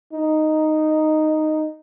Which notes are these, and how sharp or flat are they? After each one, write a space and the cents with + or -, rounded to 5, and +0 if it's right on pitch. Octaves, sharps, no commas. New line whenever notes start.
D#4 -5